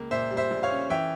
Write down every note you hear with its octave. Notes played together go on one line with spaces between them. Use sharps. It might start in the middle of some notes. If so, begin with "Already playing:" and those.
Already playing: C#2 A#3
A#2 C5 E5
G3
C5 E5
A#1
C#5 F5
C#4
E3 E5 G5